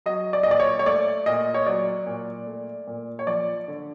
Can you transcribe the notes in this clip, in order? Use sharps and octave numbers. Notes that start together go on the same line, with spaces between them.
F#3 D#5
D5
A#2 D#5
D5
C#5
C#5
A3 D5
A#2 D#5
C#5
F#3 D5
A#2
A3
A#2
C#5
F3 D5
D3